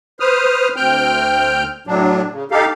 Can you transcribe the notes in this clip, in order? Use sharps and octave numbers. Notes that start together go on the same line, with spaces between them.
B4 C5 D#6 F6
D2 C4 G5 F6 G6
A2 F#3 D4
C#3
D#4 G4 A4 F5